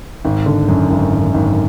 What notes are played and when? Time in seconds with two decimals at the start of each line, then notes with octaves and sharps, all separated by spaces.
0.25 G#1
0.46 D3
0.68 F#2
0.91 G#1
1.13 G#1
1.34 G#1